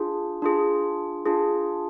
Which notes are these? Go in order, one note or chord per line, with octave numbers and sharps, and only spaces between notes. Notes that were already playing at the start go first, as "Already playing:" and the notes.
Already playing: D4 F4 G#4
D4 F4 G#4
D4 F4 G#4